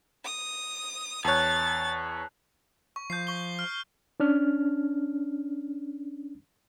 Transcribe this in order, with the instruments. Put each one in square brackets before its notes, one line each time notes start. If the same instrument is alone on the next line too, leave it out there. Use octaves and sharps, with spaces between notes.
[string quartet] D#6
[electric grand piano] E2 C#5 [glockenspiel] A5 F#6 [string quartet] A6
[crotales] C#6
[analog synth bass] F3 [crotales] G6 C7
[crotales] C#6 G7
F6
[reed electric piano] C#4 D4 F6